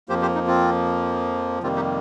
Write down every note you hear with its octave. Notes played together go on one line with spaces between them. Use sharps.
F2 F3 A#3 G4 C5
G4 C5
D#4
C4 F4
F2 C3 D#3 G3 A#3 C4 F4
D#4 G4